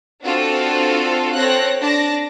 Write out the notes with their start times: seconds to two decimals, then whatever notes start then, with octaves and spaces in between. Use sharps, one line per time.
0.24 C4 D4 F4 F#4 A4
1.36 C4 A4 C#5 F#6 A#6
1.80 D4 A5 A#6